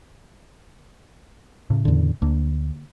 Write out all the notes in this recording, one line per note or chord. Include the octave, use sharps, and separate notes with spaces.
A2 C#3
E2 D3
D2 D3 A#3